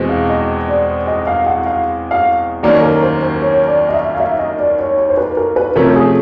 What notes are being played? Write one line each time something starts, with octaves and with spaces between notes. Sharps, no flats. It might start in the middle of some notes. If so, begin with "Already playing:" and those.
Already playing: E2 B2 G#3 C4
F5
D#5
D5
D#5
F5
F#5
F5
F5
D#2 D#3 F#3 A#3 C#4 D5
A#4
C5
C5
C#5
D5
D#5
E5
F5
E5
D#5
D5
C#5
C#5
C5
B4
A#4
B4
C3 F3 A3 C#4 A#4
G#4